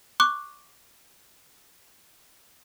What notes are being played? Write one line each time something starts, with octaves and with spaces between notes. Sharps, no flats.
C#6 D6 F#6